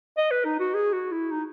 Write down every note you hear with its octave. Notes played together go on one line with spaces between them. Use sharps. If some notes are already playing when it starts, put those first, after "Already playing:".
D#5
B4
D#4
F#4
G#4
F#4
E4
D#4